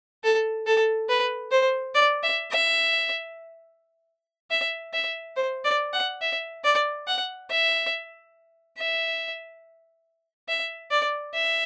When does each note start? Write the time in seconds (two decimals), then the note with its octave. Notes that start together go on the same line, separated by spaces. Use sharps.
0.24 A4
0.66 A4
1.09 B4
1.52 C5
1.95 D5
2.23 E5
2.52 E5
4.51 E5
4.94 E5
5.36 C5
5.64 D5
5.93 F#5
6.21 E5
6.64 D5
7.07 F#5
7.50 E5
8.78 E5
10.49 E5
10.91 D5
11.34 E5